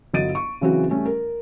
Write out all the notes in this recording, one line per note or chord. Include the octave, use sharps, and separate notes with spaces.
G1 F#3 D#5 A6 D7 D#7
C#6
C#3 E3 F#3 C4 F#4
G3 A3 C#4
A#4